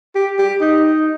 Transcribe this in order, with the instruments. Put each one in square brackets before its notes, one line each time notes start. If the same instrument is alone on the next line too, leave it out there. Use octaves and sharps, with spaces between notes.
[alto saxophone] G4
G4
D#4